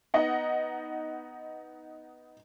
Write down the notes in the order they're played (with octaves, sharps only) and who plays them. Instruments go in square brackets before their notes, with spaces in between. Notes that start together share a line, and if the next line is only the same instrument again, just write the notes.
[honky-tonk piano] B3 D#4 D#5 F#5